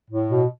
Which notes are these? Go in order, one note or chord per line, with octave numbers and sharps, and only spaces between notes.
A2
B2